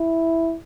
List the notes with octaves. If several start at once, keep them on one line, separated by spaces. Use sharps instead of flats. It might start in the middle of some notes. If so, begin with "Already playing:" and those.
Already playing: E4